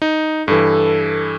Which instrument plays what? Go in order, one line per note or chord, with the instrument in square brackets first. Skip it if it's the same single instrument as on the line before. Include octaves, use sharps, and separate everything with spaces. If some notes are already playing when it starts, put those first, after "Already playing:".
[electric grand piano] D#4
[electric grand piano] G2 E3 [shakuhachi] A4